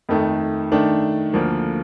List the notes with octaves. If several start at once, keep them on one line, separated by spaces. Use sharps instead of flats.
F2 D#3 A3
D#3 A3 D4
D2 D3 F3 A#3